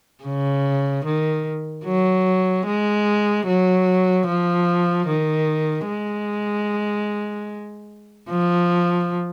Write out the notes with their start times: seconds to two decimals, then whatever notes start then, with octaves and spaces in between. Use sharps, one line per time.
0.24 C#3
1.05 D#3
1.85 F#3
2.66 G#3
3.47 F#3
4.27 F3
5.08 D#3
5.88 G#3
8.30 F3